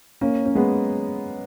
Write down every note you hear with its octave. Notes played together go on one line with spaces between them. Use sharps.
A#3 C#4
C#4
G#3 B3